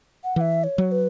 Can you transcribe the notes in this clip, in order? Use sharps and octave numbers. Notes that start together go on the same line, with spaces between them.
F#5
E3 E5 F#5
C#5
F#3
B4